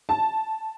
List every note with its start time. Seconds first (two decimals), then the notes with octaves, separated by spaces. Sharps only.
0.09 A5